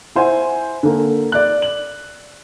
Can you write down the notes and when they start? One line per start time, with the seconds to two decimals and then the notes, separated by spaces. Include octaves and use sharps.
0.15 E4 C5 F#5 G#5
0.83 D3 A#3
1.32 D5 F#6
1.62 F#7